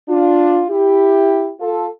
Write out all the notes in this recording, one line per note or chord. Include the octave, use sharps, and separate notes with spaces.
D4 F4
E4 G4
F4 A4